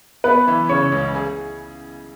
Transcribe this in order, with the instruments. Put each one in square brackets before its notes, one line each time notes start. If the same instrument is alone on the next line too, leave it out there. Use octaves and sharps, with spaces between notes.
[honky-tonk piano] B3 [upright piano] B4
[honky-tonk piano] E3
[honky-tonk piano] C#3 [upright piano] C#5
[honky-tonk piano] C#2
G#4